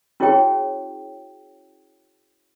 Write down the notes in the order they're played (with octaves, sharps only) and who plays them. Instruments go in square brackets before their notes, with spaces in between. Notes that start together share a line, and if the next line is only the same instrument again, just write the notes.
[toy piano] C#4 E4 F#4 G#4 C#5 G5